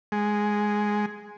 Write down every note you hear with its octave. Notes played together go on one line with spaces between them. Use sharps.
G#3